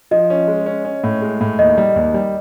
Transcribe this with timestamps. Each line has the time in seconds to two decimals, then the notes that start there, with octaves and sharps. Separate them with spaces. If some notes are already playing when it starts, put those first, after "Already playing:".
0.11 F3 D#5
0.30 C#4
0.48 G#3
0.66 C#4
0.85 C#4
1.04 A2
1.22 G#3
1.41 A2
1.59 D#2 D#5
1.78 G3
1.96 D#2
2.14 G3